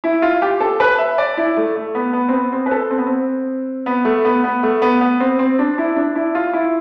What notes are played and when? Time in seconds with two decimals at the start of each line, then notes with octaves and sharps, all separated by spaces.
0.04 E4
0.22 F4
0.42 G4
0.60 A4
0.80 B4
0.98 E5
1.18 D5
1.37 E4
1.57 A3
1.76 A3
1.95 B3
2.13 B3
2.29 C4
2.33 B3
2.52 C4
2.66 B4
2.71 A4
2.91 C4
2.98 B3
3.07 C4
3.86 B3
4.05 A3
4.25 B3
4.44 B3
4.63 A3
4.82 B3
5.01 B3
5.20 C4
5.39 C4
5.59 D4
5.78 E4
5.96 D4
6.15 E4
6.35 F4
6.53 E4